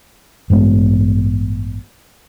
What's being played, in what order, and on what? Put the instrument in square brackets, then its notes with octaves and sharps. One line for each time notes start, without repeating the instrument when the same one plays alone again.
[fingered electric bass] A1 G2 G#3 B3